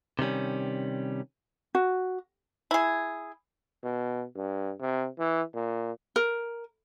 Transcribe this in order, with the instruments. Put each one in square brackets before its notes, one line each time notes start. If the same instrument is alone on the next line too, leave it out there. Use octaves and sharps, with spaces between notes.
[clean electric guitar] C3 D#3 G3 C#4
[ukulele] F#4
[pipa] E4 G#4
[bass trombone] B2
G2
C3
E3
A#2
[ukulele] A#4